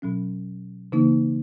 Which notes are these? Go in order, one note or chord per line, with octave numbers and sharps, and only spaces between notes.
B2 F#3 C#4
C#3 E3 A#3 D#4